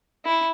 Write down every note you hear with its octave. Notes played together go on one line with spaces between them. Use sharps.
E4